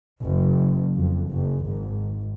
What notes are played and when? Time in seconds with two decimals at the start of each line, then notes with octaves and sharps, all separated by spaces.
0.23 F#1
0.96 F2
1.30 F#1
1.67 G#1